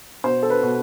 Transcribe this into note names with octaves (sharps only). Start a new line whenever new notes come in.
B2 C5
A4
B4
B2